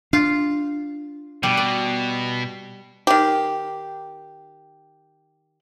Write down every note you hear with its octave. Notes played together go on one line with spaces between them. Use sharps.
D4 F4 F5
B2 G3
D5
D#3 G4